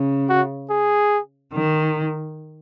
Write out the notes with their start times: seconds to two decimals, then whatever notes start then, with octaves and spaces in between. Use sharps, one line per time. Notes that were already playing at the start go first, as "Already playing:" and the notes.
Already playing: C#3
0.29 F#4
0.70 G#4
1.53 D#3